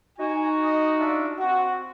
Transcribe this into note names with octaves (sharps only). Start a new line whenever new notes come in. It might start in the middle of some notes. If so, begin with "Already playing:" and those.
D#4 F#4 G#5
D#5
D4 F4 E5
C4 F#4